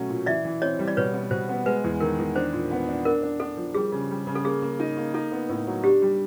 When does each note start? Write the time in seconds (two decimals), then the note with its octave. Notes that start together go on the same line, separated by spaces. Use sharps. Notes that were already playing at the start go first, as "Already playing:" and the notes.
Already playing: B2 F#3 A3 C#4
0.09 A#2
0.26 E3 D5 E5
0.45 E3
0.61 C4 C#5 D#5
0.79 G3
0.88 D5
0.97 B2 B4 C#5
1.13 B3
1.31 B2 C5
1.49 B3
1.66 G#3 B4
1.84 E2
2.00 D#3 A#4
2.19 E2
2.35 D4 C5
2.53 A#2
2.71 B3
2.89 D4
3.05 D4 A#4
3.23 D4
3.40 D4 A4
3.57 F3
3.75 G3 G#4
3.92 C#3
4.11 G3
4.27 C#3
4.35 A4
4.44 A#3 G#4
4.62 A#3
4.80 D#4
4.97 A#3
5.14 D#4 A4
5.32 B3
5.49 A2
5.67 F#3
5.83 D4 G4
6.02 G3